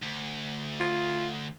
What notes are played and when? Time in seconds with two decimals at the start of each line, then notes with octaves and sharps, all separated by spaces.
0.02 D2
0.80 F4